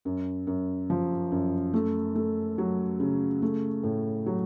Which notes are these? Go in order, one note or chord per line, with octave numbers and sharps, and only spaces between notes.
F#2
F#2
F3
F#2
A3
A3
F#3
C#3
A3
A2
F#3